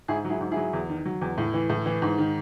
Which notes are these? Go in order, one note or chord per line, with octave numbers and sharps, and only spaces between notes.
G#2 E4 G#4
F#3
E4 G#4
G#2
E4 G#4
F#3
E2
D#3
F#3
E2
A2
E3
A2
E3
G#2
D#3